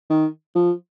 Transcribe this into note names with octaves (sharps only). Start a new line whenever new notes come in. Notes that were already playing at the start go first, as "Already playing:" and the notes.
D#3
F3